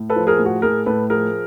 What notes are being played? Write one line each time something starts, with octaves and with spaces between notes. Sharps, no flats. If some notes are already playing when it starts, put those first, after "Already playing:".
Already playing: A2
A4 B4
F3
G#4 A#4
A2
F#4 G#4
A2 G#4 A#4
A2 A4 B4
F3 G#4 A#4